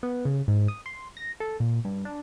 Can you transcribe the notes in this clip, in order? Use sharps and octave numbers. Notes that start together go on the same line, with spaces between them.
B3
C#3
G#2
D#6
C6
A#6
A4
A#2
G2
D4